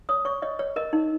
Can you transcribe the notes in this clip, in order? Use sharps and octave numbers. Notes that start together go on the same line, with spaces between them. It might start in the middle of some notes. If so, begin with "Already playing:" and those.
C#5 D#6
C#5 C#6
C#5 D#5
C#5
A#4 D#5
D#4